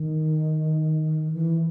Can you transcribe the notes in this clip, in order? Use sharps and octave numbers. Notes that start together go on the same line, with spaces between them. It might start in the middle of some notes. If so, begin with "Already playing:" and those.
Already playing: D#3
E3